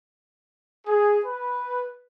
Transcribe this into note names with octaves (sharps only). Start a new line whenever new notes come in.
G#4
B4